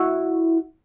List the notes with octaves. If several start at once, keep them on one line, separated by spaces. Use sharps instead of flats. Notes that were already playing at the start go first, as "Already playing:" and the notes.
Already playing: E4 F#4